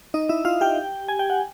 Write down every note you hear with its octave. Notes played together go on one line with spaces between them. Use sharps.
D#4 D#5
E4 E5
F4 F5
G4 G5
G#5
G5
F#5